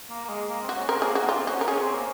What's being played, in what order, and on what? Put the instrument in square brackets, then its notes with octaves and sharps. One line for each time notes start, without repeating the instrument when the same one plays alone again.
[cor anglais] A#3
A#3
G#3
A#3
C4
[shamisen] F#4
[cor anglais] C#4
[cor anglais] C4 [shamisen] A#4
[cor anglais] A#3 [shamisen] G#4
[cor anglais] A#3 [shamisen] F#4
[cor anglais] C4 [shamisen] F4
[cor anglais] C#4 [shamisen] F#4
[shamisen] A#4
[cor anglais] C#4 [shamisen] G#4
[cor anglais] C4
A#3